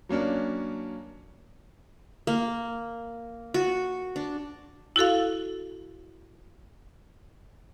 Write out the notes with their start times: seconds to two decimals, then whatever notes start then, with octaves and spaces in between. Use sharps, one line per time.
0.09 F#3 A#3 C#4 D4
2.27 A#3
3.54 F#4
4.16 D4
4.96 E4 F#4 A4 F5